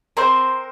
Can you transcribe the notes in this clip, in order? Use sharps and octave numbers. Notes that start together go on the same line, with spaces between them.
C4 A#4 C5